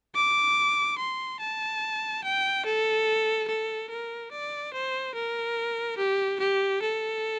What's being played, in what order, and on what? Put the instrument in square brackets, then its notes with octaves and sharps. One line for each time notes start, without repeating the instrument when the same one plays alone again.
[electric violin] D6
C6
A5
G5
A4
A4
A#4
D5
C5
A#4
G4
G4
A4